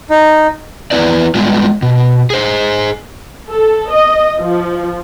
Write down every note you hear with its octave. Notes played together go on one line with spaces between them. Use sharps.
D#4
E2 B3 E4 B4 D5
G3 G#3 B3 D4 F4
B2
G#4 C5
A4
D#5
F3